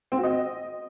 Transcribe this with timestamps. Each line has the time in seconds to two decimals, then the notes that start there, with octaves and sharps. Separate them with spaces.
0.12 C4
0.18 F#4
0.23 D#5